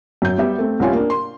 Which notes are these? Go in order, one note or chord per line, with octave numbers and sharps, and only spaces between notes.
F#2 G6
G3 B3 G4 E5
A3 C4
C2 C3 G3 C#4 F4 G#5
A#3 D4
C6